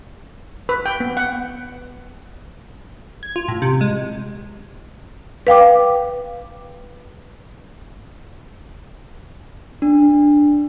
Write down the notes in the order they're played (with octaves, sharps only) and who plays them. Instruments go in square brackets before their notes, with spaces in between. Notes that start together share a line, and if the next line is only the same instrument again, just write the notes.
[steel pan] B4
G5
B3
F#5
[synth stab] G#6
F4
A2
C3
G#3
[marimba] B4 F5 G5 D6
[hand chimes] D4